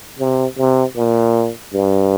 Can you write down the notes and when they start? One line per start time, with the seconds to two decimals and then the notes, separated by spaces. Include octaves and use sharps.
0.19 C3
0.57 C3
0.97 A#2
1.73 G2